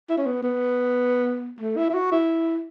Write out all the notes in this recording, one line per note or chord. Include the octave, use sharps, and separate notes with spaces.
E4
C#4
B3
B3
A3
E4
E4
F#4
E4